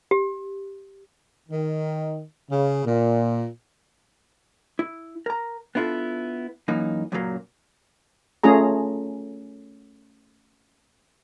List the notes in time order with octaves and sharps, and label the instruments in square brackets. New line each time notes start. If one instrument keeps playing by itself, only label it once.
[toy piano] G4
[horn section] D#3
C#3
A#2
[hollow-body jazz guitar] E4
A#4 A#5
B3 D4 E4 F4 A4
F#2 E3 A#3 D#4
F#2 A#2 C#3 F#3 A#3
[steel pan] A3 C#4 F4 G#4 A#5